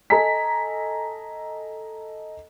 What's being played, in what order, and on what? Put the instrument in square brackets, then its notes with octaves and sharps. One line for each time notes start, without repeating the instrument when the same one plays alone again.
[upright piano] A4 D#5 G#5 A#5 B6